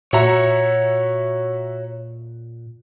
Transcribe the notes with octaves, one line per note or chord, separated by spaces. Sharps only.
A#2 F#4 C#5 E5 A#5